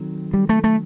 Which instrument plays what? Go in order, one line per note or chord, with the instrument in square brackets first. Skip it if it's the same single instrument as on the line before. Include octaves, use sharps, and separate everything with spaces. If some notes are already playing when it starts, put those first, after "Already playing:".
Already playing: [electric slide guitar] D#3 F#3 C4 D#4 A4
[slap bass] G3
A3
A3